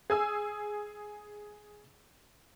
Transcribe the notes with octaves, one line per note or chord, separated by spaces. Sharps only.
G#4 G#5 E6